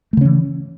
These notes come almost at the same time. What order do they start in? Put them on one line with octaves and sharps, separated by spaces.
A3 C#3 C#4 E3